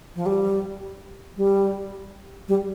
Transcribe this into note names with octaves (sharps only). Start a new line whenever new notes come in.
F3
G3
G3
G3